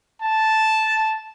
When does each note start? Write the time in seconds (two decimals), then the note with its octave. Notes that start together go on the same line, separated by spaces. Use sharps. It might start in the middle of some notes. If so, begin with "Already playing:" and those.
0.22 A5